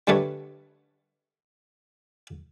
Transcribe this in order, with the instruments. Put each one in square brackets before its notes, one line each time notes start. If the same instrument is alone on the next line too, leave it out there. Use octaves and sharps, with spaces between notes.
[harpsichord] D3 G3 A3 A4 B4 C#5